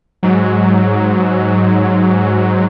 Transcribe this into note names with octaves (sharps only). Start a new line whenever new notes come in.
G#2 F#3